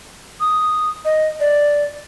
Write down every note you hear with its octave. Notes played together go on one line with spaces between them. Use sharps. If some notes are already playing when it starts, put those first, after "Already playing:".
D#6
D#5
D5